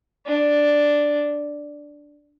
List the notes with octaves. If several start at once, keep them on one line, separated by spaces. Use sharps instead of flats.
D4